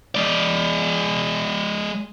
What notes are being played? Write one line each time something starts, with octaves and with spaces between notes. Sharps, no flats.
G#3 D5